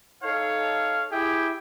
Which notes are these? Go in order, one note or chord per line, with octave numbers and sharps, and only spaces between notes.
D#4 A4 C#5 F5
E4 G4 G#4 E5 G5